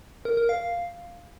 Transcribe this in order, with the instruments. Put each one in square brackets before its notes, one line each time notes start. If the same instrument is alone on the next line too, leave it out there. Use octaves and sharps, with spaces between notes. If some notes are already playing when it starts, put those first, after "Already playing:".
[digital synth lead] A#4
A#4
F5